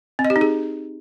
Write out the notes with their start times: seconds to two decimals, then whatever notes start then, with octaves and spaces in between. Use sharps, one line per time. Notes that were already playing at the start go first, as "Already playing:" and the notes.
0.19 C4
0.25 D#5
0.30 G4
0.36 D#4
0.41 G#4